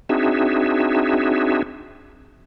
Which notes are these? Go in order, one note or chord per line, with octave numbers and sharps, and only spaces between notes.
C4 D4 D#4 F#4 G#4 E5